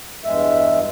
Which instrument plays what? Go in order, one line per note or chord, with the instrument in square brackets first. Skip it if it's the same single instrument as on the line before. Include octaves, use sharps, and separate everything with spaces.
[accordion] E2 G2 G#3 E5